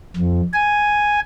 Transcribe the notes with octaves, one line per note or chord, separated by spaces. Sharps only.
F2
G#5